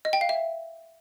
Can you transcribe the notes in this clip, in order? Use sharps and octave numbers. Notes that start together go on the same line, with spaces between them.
D#5
G5
F5
E5